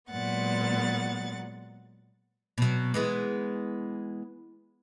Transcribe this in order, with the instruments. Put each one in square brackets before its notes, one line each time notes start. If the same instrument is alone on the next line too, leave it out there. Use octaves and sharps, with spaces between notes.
[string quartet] A#2 F#3 G#3 B3 F#5 A6
[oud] B2 F#3
E3 G#3 B3